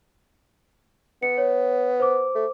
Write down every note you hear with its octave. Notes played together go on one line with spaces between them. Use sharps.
B3 C#7
C#5
C5 D6
A3